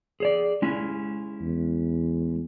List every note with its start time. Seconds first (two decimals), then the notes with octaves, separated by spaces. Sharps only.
0.20 G#4 C#5 D5
0.62 G#3 C#4 E4
1.42 E2